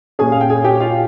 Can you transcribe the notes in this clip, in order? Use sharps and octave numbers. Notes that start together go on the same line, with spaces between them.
A#2 G3 C#4 G#4 G#5
F5
G5
G#4 G#5
G4 G5
F4 F5